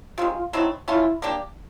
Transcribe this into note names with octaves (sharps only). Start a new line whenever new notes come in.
C3 D#3 G#3 F4
F4
F#3 A3 C4 D#4 E4
A3 C#4 E4 F4
A#3 D4 G4